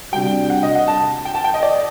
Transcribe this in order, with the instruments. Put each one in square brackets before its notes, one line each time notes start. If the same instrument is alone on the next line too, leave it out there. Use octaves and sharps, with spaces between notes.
[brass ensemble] C3 G3 D4 F#4 [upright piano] G5
[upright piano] F#5
D#5
F#5
A5
G5
A5
G5
D#5
D5